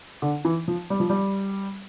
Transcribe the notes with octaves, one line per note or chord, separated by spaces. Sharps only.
D3
E3
F3
G3
F3
G3